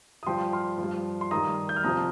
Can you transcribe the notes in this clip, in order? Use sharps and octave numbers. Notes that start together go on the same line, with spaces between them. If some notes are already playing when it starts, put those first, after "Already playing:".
D#6
G2 F3 G5 C6
C6 F6
G2 F3
C6
G2 D#3 A#5 D#6
G6
F6
F2 C3 F3 A#5 D#6